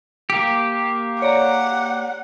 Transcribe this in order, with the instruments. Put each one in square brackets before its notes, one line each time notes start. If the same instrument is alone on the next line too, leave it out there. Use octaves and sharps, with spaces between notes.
[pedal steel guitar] A#3 G4
[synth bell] C#5 D5 A#5 [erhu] F#5